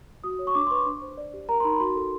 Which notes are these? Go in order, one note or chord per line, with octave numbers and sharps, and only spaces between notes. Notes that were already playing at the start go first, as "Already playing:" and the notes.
F#4 D#6
C#5
C#6
D4 D6
C6
B4 C#6
D4
C5
D5
G4
A#4 A#5
C6
D#4 B5
F#4 C6
A4